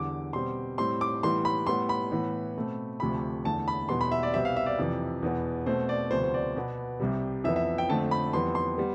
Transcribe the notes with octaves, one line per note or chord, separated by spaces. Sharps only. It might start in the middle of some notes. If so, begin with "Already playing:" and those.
Already playing: E2 D3 G3 D6
B2 G3 C4 C6
A2 G3 C4 C6
D6
A2 E3 G3 B3 C6
B5
A2 G3 B3 C6
B5
A2 E3 B3
B2 A3 C4
D2 C3 F3 A3 B5
E2 D3 A3 A5
B5
E2 B2 G3 B3 C6
B5
E5
D5
C2 B2 G3 C4 E5
F5
E5
D5
F2 C3 E3
E2 B2 B3
B2 A3 C4 C5
D5
D2 C3 F3 B3 C5
C5
D5
B2 B3
C2 C3 G3
F2 E3 B3 E5
E5
G5
F2 D3 A3 C4 A5
B5
F2 E3 G3 B3 C6
C6
G3 B3